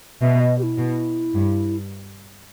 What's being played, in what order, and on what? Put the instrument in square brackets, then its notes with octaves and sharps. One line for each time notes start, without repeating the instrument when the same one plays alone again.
[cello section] B2 [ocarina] E5
[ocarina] D#5
G4
E4
[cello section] B2
G2